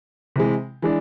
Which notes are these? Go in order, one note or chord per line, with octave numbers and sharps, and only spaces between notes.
C3 E3 G#3
E3 G#3 D4